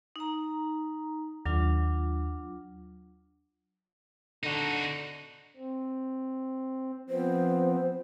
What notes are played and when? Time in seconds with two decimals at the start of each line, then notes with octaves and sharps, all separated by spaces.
0.16 D#4 A#5
1.45 D#2 F#3 D4 F4
4.43 D3 D#4 F#4
5.57 C4
7.10 F3 B3 C4 C5